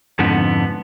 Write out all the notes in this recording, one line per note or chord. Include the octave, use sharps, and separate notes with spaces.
F2 G#2 D3 F3 B3